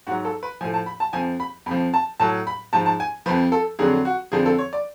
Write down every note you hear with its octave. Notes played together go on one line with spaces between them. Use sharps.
G#2 F#3 F#4
A4
B4
A2 F3 G#5
A5
B5
A5
F2 F3 G#5
B5
F2 F3 B5
A5
A2 F#3 A5
B5
G#2 F3 A5
A5
G#5
F2 F3 B4
A4
F2 D3 F#3 G#4
F#4
F2 D3 F3 G#4
A4
C#5
D5